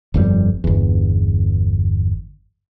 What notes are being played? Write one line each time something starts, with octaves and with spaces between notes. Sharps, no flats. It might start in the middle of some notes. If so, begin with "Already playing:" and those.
G1 F2 C3 G3
G1 E2